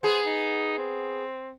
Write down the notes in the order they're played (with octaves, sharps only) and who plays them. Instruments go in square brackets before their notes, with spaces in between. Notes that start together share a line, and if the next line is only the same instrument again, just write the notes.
[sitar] B3 G#4 [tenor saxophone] C5
[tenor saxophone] D#4
C4